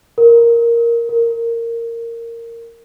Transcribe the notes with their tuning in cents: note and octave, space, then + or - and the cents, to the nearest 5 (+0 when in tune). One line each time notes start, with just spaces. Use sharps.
A#4 +5
A#4 -10